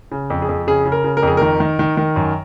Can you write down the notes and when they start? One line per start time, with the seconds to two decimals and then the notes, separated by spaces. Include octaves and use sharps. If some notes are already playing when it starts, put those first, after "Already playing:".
0.11 C#3
0.30 F2
0.42 G#4
0.49 F2
0.67 C#3 G#4
0.85 C#3
0.92 A#4
1.04 C#3
1.17 A#4
1.23 F2 G#4
1.37 D#3 A#4
1.60 D#3
1.79 D#3
1.97 D#3
2.16 F#2